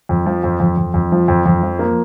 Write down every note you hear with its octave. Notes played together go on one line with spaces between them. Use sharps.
F2
F3
F2
F2
F2
F2
F3
F2
F2
F3
A#3